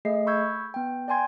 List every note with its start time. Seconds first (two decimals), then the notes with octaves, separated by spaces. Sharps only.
0.05 A3 G#4 D#5 C7
0.27 B5 C#6 E6 G6 G#6
0.74 B3 G5
1.08 D5 G5 G#5 C6 G#6